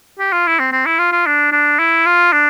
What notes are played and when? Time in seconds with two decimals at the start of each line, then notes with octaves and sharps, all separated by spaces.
0.19 G4
0.32 F4
0.47 E4
0.59 C4
0.72 C4
0.86 E4
0.99 F4
1.12 F4
1.26 D4
1.52 D4
1.79 E4
2.06 F4
2.32 D4